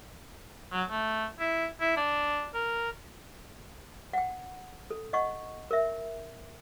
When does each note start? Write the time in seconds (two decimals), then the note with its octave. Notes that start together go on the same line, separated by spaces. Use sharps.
0.72 F#3
0.89 A3
1.40 E4
1.81 E4
1.97 D4
2.54 A#4
4.13 F#5 G5
4.91 A4
5.13 D#5 F#5 C#6
5.71 A#4 E5